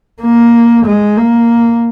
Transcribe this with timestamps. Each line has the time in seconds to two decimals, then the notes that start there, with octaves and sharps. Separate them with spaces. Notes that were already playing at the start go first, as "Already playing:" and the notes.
0.22 A#3
0.86 G#3
1.18 A#3